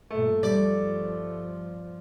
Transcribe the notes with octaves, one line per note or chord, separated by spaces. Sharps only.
G2 A#2 A3
G1 F3 G3 D5